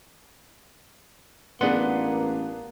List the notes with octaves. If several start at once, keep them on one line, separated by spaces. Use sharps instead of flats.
A1 A#3 B3 D4 G#4 B4 F#5 C6